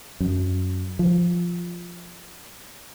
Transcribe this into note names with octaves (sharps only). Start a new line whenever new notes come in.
F#2
F3